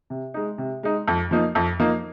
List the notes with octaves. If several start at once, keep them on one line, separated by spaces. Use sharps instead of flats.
C3
G#3 D#4
C3
G#3 D#4
F2
F3 A#3 D#4
F2
F3 A#3 D#4